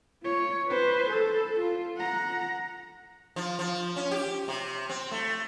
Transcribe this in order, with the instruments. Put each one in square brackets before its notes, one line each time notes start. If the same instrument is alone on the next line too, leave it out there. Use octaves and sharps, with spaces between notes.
[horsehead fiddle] F4 C#5
B4 C5
A4
F4
F#5 A#5
[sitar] F3
F3
C#4
G4
C3
C4
A3